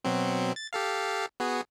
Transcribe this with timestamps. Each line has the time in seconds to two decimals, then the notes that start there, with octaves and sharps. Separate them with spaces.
0.04 B2 F#3 C4
0.56 A6
0.73 G4 A4 F5
1.40 B3 F#4 G#4